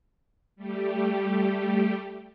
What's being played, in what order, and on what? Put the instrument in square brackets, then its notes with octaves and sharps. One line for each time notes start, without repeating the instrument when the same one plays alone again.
[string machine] G3 A3 G4